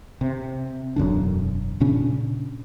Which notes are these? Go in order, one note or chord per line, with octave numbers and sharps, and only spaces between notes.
C3
E1 F#2 D3 D4
A#2 C#3 C#4 D4